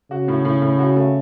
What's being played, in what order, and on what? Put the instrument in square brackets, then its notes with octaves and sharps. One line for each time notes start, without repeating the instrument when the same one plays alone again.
[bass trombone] C#3 [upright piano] F#4
[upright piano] A2
A2
A2
F#4
A3